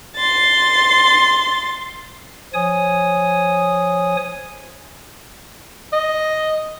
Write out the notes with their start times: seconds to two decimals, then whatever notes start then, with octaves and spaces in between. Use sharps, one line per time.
0.17 C6 A6
2.54 F3 C#5 G#5 D#6
5.93 D#5